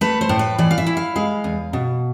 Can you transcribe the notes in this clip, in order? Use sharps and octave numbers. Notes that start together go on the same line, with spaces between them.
A3 B4
C5
A2
B4
E3 D5
F5
E5
E4
F5
G#3 F5
E2
B2